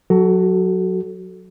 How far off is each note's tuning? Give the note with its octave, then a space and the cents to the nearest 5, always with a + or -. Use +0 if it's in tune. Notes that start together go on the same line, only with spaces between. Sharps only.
F#3 -15 F#4 +20 A4 +0